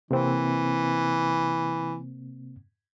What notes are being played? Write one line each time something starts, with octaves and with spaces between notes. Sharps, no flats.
C3 E3 A#3 C4